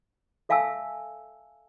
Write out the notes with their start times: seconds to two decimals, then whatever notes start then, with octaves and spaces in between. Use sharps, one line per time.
0.49 A4 E5 F5 G#5 A5 E6